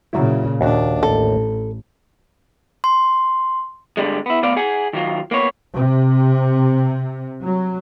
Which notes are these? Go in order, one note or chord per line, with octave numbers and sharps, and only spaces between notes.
A#2 C#3 F#3 E4
D#2 A#2 D4 F#4
A1 A4
C6
G2 D3 G3 G#3
B3 E4
D2 B3 D5 F5
G#4 F#5 G#5
D#3 F#3 F4
A#3 B3 C#5
C3
F#3